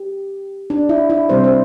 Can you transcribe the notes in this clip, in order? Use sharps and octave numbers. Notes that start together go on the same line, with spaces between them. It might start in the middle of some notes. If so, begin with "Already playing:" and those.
Already playing: G4
D4
E4
E4
C3 G3 C4 C5
C5